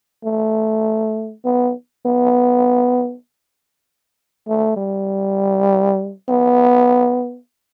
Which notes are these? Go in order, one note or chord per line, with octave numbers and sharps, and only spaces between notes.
A3
B3
B3
A3
G3
B3